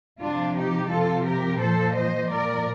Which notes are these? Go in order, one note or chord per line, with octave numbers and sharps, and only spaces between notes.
C3 F3 D4 F4
D#4 G4
C3 F3 F4 A4
G4 A#4
A#2 F3 A4 C5
C5 D#5
A#2 F3 A#4 D5